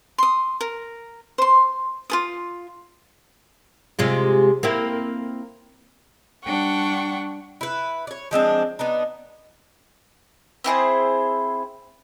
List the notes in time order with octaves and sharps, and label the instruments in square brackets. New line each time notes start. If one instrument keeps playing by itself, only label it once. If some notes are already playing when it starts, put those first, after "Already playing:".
[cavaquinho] C6 D#6
A#4
C5 C6
F4 A4 D#6
[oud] C3 G#3 F4
A#3 C4 E4
[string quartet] G3 D4 F#5 G5 C#6
[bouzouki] E4 B4
C#5 D5
F3 G#3 C4 D4
B3 D4 D#4
[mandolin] C4 E4 G#4 C5